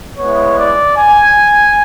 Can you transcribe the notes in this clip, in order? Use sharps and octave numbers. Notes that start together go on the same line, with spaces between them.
G#3 B3 E4 C#5
D5
G#5